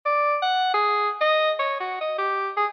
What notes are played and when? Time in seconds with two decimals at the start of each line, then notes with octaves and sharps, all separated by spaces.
0.06 D5
0.42 F#5
0.74 G#4
1.21 D#5
1.59 C#5
1.80 F#4
2.01 D#5
2.18 G4
2.57 G#4